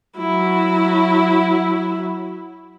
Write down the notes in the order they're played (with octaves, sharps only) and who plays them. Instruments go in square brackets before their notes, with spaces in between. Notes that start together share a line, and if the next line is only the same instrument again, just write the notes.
[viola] F#3 E4